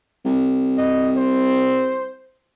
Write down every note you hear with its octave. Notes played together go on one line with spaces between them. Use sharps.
C2
D#5
C5